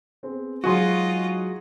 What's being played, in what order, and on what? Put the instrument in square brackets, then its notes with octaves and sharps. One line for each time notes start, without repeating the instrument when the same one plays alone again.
[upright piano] B3 C4 G#4
[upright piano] G#2 F#3 [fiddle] F4 D#5 [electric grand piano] F#4 G#4 C6